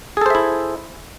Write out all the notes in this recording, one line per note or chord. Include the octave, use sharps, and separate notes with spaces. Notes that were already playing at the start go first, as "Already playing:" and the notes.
E4 G#4 A4 C5 E5